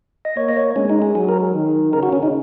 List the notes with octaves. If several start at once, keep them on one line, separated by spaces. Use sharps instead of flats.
D#5
A#3 C#5
D#5
C#5
G#3 C#4
D#4
G#4
F#3 G#4
A#4
D#3
C#3 A#4
F#4
C#4
D#4